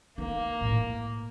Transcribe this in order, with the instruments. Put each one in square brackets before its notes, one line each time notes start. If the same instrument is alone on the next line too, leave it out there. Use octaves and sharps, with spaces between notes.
[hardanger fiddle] A#3 [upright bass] D#4
[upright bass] A2